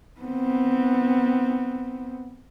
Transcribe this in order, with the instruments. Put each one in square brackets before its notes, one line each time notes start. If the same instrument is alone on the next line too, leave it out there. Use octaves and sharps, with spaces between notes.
[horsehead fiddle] B3 C4